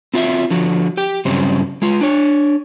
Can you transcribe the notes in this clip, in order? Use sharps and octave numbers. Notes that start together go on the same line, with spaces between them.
C4 F4 F#4 E5
D3 F3 F#4
G4 G5
G2 C#3 F#3 G3 C4
G#3 F4
D4 C#5